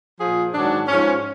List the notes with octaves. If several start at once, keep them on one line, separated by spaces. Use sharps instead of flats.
A#2 F3 G#4
G#2 D#3 F#3 D4
G#2 F3 C#4